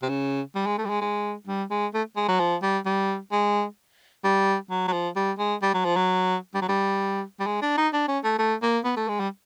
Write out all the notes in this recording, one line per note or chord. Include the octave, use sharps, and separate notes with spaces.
C3
C#3
G3
G#3
A3
G3
G#3
G#3
G3
G#3
A3
G#3
F#3
F3
G3
G3
G#3
G3
F#3
F#3
F3
G3
G#3
G3
F#3
F3
F#3
G3
F#3
G3
G3
G#3
D4
D#4
D4
C#4
A3
A3
A#3
B3
A3
G#3
G3